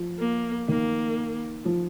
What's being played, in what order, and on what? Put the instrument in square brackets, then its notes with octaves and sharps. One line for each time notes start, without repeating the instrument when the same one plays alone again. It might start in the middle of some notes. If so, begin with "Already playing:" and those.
Already playing: [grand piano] F3
[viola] A#3
[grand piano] D#3 [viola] A#3
[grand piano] F3